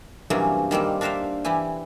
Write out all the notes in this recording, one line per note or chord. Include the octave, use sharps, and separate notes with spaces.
G2 C3 E3 F#3 A#3 C#4
D#3 G3 A#3 C4
D4 A#4 C5 E5 F5
E3 E4 G4 G#5